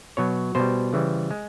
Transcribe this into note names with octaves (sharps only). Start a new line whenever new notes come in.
B2 F#3 C#5
B2 G3 C5
C#3 E3 G3
G#3